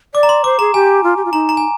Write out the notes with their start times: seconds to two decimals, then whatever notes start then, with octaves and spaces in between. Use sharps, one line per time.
0.14 D5 D6
0.23 A#5
0.29 C6
0.44 C5 D6
0.59 G#4 A#5
0.74 G4 G#5
1.03 F4
1.17 G4
1.25 F4
1.33 D#4 A#5
1.49 A#5
1.57 G#5